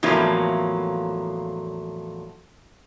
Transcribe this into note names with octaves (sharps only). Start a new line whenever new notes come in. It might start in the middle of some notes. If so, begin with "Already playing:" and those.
E2 A2 F3 F#3 A#3